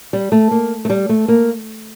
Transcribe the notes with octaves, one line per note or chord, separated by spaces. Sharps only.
G3
A3
A#3
A3
G3
A3
A#3